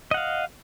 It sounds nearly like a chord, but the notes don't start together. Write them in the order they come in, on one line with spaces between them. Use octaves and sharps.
D#5 F#5 F5